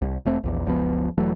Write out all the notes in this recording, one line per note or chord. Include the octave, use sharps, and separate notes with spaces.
C2
E1 A3 C4
A#1 E2
F#1 C#2 F3 B3
E1 E3 F#3 A3